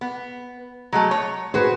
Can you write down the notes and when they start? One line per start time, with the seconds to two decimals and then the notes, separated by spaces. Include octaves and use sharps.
0.01 B3
0.92 F#3 G#3 A3
1.11 C#5
1.54 F#4 G#4 B4 C5